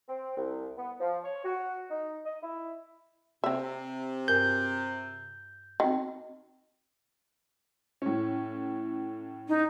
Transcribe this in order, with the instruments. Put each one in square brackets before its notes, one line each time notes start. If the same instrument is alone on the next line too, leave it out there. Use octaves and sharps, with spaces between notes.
[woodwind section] C4
C2
B3
F3
C#5
F#4
D#4
D#5
E4
[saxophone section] C3 [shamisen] C4 E5
[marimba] G2 A#4 [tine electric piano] G6
[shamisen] D#3 [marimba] C4 F#4 D#5
[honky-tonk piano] A2 C#4
[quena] D#4